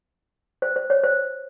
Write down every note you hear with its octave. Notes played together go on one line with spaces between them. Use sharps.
C5
C5
C#5
C5